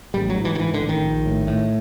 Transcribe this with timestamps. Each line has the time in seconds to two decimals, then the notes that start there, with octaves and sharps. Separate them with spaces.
0.14 A1 G3
0.30 F#3
0.36 G#2
0.45 E3
0.55 D#3
0.59 G#2 E3
0.74 D3
0.80 A1
0.89 D#3
1.03 A#1
1.26 A2
1.47 A2